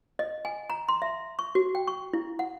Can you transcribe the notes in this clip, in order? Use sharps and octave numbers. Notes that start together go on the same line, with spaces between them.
D#5
G#5
A#5
C6
E5
C#6
F#4
G5
C#6
E4
F#5